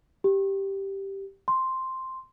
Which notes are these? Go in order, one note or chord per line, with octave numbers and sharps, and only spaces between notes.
G4
C6